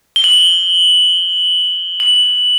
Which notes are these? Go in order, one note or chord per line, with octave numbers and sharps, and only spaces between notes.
G7
F#7
F#7